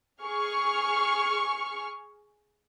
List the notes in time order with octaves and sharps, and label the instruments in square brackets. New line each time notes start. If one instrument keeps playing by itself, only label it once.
[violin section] G#4 C#6 F6